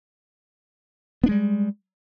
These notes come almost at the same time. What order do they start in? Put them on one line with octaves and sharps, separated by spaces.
B3 D4 G#3 G3